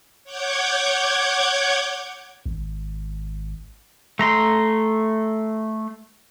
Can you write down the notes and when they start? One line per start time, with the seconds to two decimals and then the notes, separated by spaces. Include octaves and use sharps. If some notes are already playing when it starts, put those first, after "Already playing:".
0.24 C#5 F#5 D6 G6 G#6
2.46 G#1
4.19 A3 A#5 C6